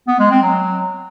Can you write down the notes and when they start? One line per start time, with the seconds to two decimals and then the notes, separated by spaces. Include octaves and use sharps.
0.08 B3
0.19 G#3
0.31 C4
0.43 F#3